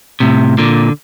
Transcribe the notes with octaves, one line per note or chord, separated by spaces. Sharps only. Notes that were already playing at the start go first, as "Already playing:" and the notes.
A2 C3
A#2 D3